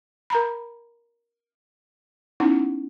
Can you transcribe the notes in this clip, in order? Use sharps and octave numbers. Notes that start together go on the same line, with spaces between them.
A#4 A#5 B5
B3 C#4 D#4 E4 F#5